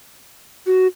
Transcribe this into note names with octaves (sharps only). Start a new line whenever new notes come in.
F#4